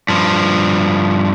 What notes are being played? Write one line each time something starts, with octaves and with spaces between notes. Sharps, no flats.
G2 F3